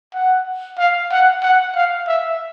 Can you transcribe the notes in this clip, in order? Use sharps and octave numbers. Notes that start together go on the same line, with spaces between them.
F#5
F5
F#5
F#5
F5
E5